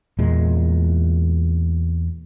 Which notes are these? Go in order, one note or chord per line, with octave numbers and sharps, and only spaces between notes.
E2 A#2 G#3